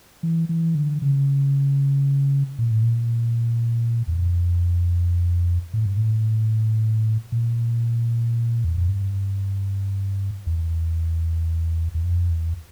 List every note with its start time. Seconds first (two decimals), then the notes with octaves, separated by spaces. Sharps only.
0.23 E3
0.49 E3
0.75 D3
1.02 C#3
2.59 A#2
2.71 A2
2.82 A#2
4.08 E2
4.17 F2
5.73 A2
5.85 G2
5.97 A2
7.32 A#2
8.64 E2
8.77 F2
8.89 G2
10.47 E2
11.94 E2
12.04 F2
12.30 E2